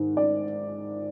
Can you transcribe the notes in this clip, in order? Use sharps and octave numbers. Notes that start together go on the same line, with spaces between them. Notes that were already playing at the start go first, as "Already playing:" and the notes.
Already playing: G#2 D#3
D5